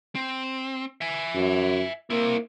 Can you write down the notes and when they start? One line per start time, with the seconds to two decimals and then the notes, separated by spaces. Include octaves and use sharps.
0.15 C4
1.01 E5 G#5
1.34 F#2
2.10 A#3 C4 E4